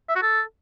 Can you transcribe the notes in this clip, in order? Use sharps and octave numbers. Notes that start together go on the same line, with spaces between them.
E5
F#4
A4